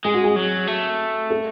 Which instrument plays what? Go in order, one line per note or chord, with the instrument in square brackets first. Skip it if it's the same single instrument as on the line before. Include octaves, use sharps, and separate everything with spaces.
[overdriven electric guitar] G#3 [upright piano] G#4
[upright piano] F#4
G#4
[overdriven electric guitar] F#3
A3
[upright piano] A4